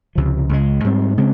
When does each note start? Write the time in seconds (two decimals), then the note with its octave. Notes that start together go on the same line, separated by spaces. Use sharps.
0.15 C#2 C3 F3
0.49 C#2 C#3 G#3
0.84 G#2 G3 C4
1.17 C#3 G#3 C4